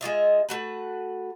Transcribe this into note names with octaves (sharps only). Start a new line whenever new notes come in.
G#3 F4 D#5 E5
A3 F#4 B4